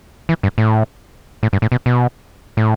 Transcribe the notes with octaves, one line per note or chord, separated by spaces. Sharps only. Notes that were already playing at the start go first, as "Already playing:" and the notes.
E3
G2
A2
A2
G2
A2
B2
B2
A2